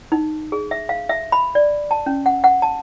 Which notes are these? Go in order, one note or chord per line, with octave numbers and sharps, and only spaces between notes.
D#4
G#4
E5
F5
E5
B5
D5
A5
C#4
F#5
F#5
A5